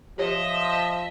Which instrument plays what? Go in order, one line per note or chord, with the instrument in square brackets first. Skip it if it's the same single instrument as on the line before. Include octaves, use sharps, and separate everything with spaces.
[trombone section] F3 [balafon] G4 C#5 [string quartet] D#5 E5